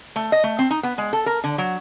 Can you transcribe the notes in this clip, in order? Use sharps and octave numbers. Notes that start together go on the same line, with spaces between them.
A3
D#5
A3
C4
D#4
B3
G#3
A4
A#4
D3
F#3